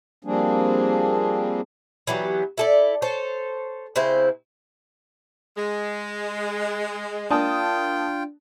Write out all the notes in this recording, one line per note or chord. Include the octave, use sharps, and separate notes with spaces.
F3 G3 A#3 C4 D4 G#4
E3 F#3 B3 G4
E4 A4 D5
A4 C5 C#5
C#3 C4 E4 C5
G#3
A#3 D4 F4 G5 A5 D#6